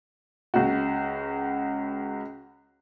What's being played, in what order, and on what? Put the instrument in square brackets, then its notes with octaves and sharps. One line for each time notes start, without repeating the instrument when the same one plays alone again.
[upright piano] C#2 F#4